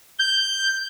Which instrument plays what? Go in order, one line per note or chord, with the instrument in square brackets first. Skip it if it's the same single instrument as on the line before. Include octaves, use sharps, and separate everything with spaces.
[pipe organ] G6